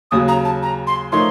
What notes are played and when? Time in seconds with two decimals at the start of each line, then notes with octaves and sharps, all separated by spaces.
0.11 D#2 C#3 F#3 D#6
0.28 A#5
0.45 A5
0.63 A#5
0.87 C6
1.12 F3 A3 D#4 A#4 C#5 C6